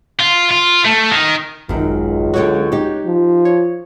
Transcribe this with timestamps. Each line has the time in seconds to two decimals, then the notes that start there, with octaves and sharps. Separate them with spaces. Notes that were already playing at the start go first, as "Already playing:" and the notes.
0.20 F4
0.51 F4
0.85 A3
1.12 D#3
1.69 G#1 C#2 F#2 D#3
2.34 D3 F#3 F#4 C#5 G5
2.72 D#4 G4
3.05 F3
3.45 C#5